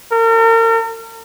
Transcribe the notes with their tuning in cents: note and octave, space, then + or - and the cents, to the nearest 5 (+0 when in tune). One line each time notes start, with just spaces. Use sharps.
A#4 -40